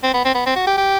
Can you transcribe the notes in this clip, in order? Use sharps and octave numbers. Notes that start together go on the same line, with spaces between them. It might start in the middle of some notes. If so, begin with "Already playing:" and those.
C4
B3
C4
B3
C4
F#4
G4
G4